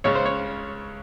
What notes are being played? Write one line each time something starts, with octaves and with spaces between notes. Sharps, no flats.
C#2 C#3 C#5
C5
C#5